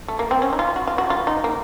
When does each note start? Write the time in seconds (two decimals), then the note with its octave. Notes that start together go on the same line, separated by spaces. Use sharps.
0.08 A3
0.19 A#3
0.31 C4
0.42 C#4
0.53 D#4
0.59 F4
0.76 F#4
0.87 F4
0.98 F#4
1.10 F4
1.27 D#4
1.44 A#3